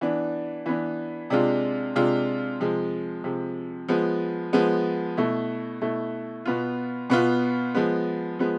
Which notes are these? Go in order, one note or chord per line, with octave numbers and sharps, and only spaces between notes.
E3 B3 D4
E3 B3 D4
C3 G#3 D4 F4
C3 G#3 D4 F4
C3 F3 G#3
C3 F3 G#3
F3 G#3 B3
F3 G#3 B3
B2 A3 E4
B2 A3 E4
B2 B3 F4
B2 B3 F4
F3 G#3 B3
F3 G#3 B3